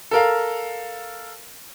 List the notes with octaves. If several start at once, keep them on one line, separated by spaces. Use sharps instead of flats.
A4 A#4 F5